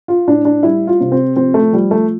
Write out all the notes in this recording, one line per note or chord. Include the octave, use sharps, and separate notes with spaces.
F4
A2 D4
D4
G3 E4
F4
C3
C4
F3 C4
A3
F3 G3
A3